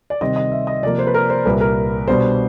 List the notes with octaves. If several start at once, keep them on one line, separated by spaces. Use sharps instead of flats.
D5
C3 D#3 G3 C4 D#5
D#5
E5
D#5
C3 F3 A#3 D5
C5
B4
A#4
C5
C2 A#2 G3 A#3 B4
A#4
B2 G3 B3 D4 C5